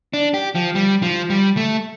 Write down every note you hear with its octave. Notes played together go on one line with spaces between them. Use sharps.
D4
G4
F3
G3
F3
G3
A3